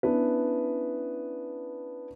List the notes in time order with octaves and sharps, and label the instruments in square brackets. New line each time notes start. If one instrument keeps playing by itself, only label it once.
[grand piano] B3 C#4 D4 E4 B4